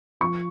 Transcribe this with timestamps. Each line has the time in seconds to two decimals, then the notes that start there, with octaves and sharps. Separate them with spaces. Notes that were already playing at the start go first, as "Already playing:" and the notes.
0.21 F3 C#6